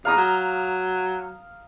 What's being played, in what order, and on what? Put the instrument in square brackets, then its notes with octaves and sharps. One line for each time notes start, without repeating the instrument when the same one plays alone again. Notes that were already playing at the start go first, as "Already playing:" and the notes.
[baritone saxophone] E2 [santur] F5 A#5 D#6
[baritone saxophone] F#3